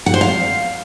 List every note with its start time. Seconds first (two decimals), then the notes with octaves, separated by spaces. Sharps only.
0.06 F#5
0.14 C5
0.21 F5